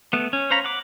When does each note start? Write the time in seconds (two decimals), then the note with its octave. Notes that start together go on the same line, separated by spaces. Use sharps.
0.13 A3 B3
0.33 C#4
0.51 C5 C#5 F5 A#5 B5
0.64 F#5 D6